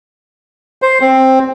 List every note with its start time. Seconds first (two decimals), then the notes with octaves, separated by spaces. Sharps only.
0.82 C5
1.01 C4